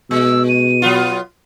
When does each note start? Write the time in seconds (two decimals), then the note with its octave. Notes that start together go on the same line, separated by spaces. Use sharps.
0.11 B2 G#3 E6
0.49 D#7
0.82 F#3 B3 F4